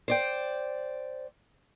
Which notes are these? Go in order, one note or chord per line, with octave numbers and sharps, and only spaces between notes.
C5 D5 G5